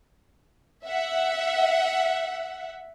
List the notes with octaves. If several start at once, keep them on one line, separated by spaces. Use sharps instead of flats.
E5 F#5